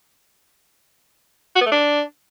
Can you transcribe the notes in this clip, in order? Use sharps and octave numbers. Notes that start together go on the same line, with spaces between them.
F#4
B3
A3
D4